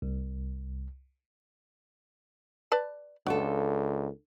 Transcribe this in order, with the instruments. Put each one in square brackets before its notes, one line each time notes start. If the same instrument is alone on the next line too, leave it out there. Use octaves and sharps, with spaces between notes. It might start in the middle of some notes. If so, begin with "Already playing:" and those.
[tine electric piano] C2
[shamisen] B4 D5 A5
[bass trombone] C#2 [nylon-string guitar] D4 F4 A4 [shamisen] F#4